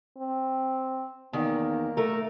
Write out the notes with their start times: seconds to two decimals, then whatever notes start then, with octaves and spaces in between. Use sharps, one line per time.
0.17 C4
1.33 E2 D#3 A#3
1.97 A3 A#4